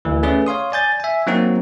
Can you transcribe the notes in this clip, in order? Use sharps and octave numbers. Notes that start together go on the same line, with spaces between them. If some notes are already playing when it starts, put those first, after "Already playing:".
D2 E3
A3 C#4 G#4 B4 D5
C#5 F5 C6 D#6
D5 G#5 G6 A6
E5 G#5
F#3 A#3 C4 D#4 F#4